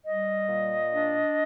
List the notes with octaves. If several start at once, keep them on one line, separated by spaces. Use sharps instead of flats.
G3 D#5
A#2
D4